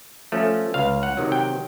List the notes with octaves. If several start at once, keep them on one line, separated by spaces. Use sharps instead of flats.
F3 A3 C#4
C#2 F5
F#5
C3 D#3 F#3
G5